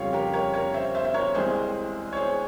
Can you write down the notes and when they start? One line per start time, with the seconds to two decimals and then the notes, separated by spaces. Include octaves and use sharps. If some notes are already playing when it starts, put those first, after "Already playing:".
Already playing: F2 C#3 G3 C#5 F5 G5
0.13 G4 A#4
0.33 A#4 C#5
0.53 A#4 C#5
0.74 C5 E5
0.95 C5 E5
1.05 E5
1.14 A#4 C#5
1.35 C2 C3 E3 G#3 G#4 C5
2.13 C#5
2.17 G#4 C5